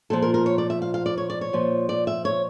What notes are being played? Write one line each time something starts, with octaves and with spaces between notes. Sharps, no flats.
A#2 F3 A4
A#4
A#4
C#5
D5
E5
F5
F5
D5
C#5
D5
C#5
A#2 F3
D5
E5
C#5